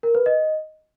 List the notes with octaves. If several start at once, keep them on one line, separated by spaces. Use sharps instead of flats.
A#4
B4
D#5